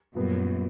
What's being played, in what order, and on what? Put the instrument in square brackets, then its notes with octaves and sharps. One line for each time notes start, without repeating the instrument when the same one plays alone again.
[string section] F#2 [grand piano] A#2 G3 B3